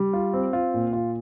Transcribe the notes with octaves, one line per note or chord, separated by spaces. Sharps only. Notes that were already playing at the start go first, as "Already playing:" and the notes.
Already playing: G3
F4
C4
F4
A#2
F4